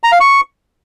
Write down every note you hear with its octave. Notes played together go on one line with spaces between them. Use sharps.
A#5
F5
C#6